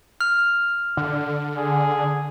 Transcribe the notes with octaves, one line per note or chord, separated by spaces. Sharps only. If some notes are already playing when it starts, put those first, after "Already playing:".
F6
D3
G#4